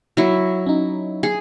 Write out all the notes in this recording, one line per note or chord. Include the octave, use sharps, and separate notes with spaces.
F#3 E4
C#4 D#4
G#4